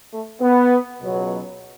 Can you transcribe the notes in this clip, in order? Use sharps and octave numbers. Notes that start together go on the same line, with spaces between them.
A3
B3
C#2 B2 F#3